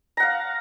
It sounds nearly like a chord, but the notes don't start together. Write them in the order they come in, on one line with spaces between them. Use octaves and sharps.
A#5 F#5 F5